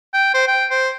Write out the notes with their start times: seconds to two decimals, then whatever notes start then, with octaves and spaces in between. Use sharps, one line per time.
0.14 G5
0.34 C5
0.48 G5
0.71 C5